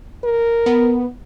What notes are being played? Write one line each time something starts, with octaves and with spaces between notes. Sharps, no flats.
A#4
B3